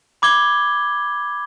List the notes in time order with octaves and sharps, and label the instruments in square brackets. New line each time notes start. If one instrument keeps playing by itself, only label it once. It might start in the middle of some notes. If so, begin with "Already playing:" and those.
[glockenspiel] B5 D6 G#6 G7